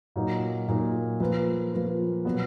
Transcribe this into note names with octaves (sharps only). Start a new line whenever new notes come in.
A#2 F#3 A#3 D#4
A#2 F#3 A#3 D#4
F3 A#3 F4 B4
F3 A#3 F4 B4
B2 F#3 B3